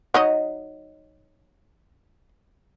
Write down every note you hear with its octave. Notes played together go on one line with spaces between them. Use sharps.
F#3 D#4 D#5